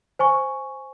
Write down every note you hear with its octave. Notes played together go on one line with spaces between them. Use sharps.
C5 G#5 C#6